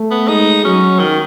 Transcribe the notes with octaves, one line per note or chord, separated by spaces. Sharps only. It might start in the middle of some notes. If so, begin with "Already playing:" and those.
Already playing: A3
B3
G#3 D#4
F#3 C#4
D#3